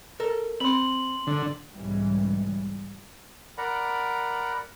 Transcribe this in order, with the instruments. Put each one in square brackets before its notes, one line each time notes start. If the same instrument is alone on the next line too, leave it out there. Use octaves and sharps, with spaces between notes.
[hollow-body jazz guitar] A4 A#4
[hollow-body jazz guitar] C4 B5 [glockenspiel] C6 F#7
[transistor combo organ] D3
[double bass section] B1 G#2 C#3 E3 G3 G#3
[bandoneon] A#4 D5 F#5 A#5 B5